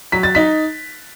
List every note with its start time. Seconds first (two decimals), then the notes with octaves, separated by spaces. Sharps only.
0.12 F#3 B6
0.23 A6
0.35 D#4 B6